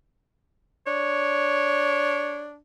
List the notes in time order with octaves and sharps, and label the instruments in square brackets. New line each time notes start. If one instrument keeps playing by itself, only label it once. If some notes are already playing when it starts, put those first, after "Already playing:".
[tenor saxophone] D4 [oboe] C#5